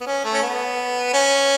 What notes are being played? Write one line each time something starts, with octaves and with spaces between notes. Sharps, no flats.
B3
C#4
A3
C#4
B3
C#4